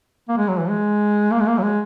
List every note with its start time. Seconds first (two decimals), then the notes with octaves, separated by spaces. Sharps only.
0.29 A#3
0.38 G#3
0.49 F#3
0.59 E3
0.69 G#3
1.31 A#3
1.40 G#3
1.48 A#3
1.58 F#3
1.63 G#3